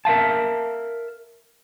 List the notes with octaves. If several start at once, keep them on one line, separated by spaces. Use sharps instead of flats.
A#4 E5 F5 A5